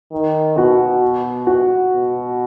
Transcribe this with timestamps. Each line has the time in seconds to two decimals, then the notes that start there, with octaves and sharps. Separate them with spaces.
0.11 D#3
0.57 B2 F#4
1.47 F#4
1.92 B2